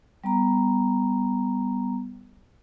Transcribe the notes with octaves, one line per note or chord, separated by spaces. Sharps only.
G3 B3 A#5